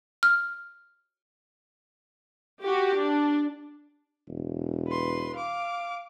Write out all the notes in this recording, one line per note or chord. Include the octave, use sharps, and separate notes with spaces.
F6
F#4 G4
D4
E1
B4 C6
F5 D6